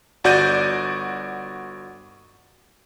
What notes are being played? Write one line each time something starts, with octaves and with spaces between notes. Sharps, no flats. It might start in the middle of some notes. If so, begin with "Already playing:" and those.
G1 F#4 D5 G6 A6 D#7